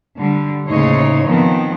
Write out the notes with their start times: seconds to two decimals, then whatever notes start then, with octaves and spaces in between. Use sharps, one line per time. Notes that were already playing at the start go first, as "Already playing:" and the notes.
0.17 D3 G3
0.69 D#2 A2 C#3 D#4 C5 C#5
1.26 D#3 F3 B3 C4